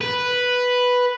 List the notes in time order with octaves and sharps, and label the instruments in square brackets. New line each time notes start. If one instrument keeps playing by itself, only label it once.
[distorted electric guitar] B4